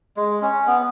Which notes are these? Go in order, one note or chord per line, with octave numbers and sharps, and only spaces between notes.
G#3
C#4
B3